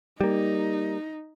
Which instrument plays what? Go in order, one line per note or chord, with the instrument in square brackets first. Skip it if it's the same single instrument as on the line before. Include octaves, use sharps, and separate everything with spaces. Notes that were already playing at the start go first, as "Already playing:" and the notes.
[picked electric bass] G3 A#3 [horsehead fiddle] D#4